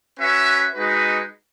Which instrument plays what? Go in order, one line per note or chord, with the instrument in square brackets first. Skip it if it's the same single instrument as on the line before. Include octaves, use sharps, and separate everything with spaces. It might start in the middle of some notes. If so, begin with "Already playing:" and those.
[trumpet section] C#4 F#4 B4 E5
G#3 D#4 F#4 B4